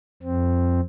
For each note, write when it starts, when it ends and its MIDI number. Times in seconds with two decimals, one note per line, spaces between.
0.23 0.80 41
0.23 0.80 60